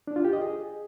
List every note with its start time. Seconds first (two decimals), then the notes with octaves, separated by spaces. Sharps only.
0.07 D4
0.16 F4
0.25 G4
0.33 D#5
0.42 G#4